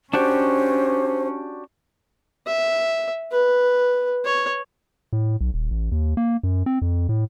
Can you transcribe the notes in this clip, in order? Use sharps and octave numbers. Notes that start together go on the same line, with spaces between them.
C#4 D4 F#4 G4 C5
E5
B4
C#5
A2
B1
D#1
A1
D#2
A#3
F#2
C4
F2
A2